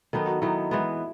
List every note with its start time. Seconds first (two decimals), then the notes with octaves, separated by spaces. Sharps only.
0.13 D#3 F#3 B3 D#4 A4
0.27 F#4
0.42 D#3 F#3 B3 D#4 E4
0.71 E3 G#3 B3